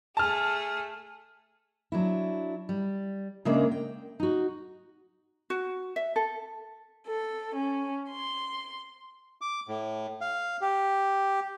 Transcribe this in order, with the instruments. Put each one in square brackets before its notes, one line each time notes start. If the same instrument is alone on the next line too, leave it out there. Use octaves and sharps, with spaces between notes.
[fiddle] A3 G#4 [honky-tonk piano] A5 F6
[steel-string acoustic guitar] F#3 D4 E4
G3
C#3 G#3 A#3 D4 A#4 E5
G5
D#4 F#4
[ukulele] F#4
E5
A4
[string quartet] A4
C#4
C6
[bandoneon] D6
A2
F5
G4